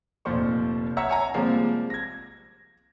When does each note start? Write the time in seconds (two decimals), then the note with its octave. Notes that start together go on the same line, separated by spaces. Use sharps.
0.25 F1 A#2 F3 C5 C#6
0.97 C#5 E5 F#5 A#5 E6
1.09 C#5 G#5 A#5
1.34 C3 F3 G3 G#3 A#3
1.90 G#6 A#6